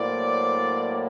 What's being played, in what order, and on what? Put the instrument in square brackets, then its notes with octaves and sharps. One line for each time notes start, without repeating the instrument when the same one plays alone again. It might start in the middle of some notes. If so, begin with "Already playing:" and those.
Already playing: [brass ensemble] A2 F#3 A#3 C5 D5